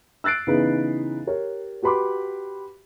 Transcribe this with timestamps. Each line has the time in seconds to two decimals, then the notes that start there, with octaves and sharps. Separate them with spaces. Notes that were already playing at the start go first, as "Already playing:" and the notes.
0.24 E6 F#6 A6 C7 D7
0.47 C#3 E3 B3 D#4 G#4 B4
1.27 G4 A#4 C#5
1.83 F#4 G4 B4 B5 C6 D6